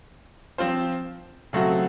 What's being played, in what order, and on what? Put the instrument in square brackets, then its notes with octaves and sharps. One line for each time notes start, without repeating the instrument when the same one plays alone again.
[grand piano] F3 C4 F4 C5
C#3 F#3 A3 C4 F#4